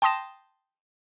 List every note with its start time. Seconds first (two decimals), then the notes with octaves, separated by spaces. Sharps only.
0.02 G5 A5 C6 D#6 A#6 E7